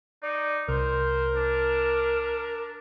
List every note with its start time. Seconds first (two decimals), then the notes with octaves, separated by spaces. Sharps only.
0.23 D#4 D5
0.68 C2 A#4 C5
1.36 D4